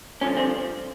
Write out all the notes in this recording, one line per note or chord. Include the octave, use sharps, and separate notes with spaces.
G2 D3 F3 C#4
C4